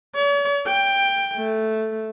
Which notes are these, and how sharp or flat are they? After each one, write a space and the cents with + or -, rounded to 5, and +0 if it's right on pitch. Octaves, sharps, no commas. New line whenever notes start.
C#5 +45
G5 +10
A3 -5